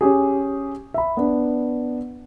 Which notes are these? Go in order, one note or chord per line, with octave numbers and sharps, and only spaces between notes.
C#4 G4 G#4
E5 B5
B3 D4